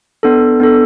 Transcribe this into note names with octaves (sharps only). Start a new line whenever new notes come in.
B3 D4 A4
B3 D4 A4